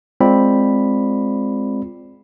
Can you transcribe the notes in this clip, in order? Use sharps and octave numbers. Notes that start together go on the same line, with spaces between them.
G#3 C4 F4 D5 B5